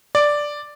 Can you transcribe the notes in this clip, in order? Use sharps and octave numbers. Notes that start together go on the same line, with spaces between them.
D5